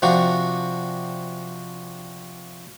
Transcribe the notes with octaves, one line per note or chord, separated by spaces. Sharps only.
C3 F3 D4 F#4